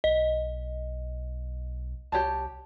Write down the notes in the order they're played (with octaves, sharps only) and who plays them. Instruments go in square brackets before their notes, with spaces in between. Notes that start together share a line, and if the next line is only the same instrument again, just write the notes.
[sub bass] B1 [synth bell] D#5
[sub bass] C2 [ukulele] G4 C#5 A5